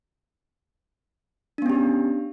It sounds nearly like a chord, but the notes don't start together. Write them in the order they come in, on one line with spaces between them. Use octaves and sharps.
D4 B3 C#4 G4